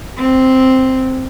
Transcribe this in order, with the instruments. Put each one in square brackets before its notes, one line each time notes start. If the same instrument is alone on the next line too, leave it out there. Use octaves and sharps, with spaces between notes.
[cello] C4